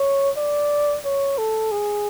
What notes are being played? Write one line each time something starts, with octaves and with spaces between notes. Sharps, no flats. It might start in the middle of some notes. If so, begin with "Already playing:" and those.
Already playing: C#5
D5
C#5
A4
G#4